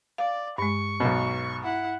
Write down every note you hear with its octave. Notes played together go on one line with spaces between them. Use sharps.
D5 F5
G2 G#3 C#6
B1 B2
E4 F#5